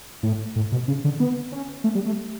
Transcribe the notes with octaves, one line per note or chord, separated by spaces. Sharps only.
A2
A2
B2
C#3
D3
B3
C#4
A3
G3
A3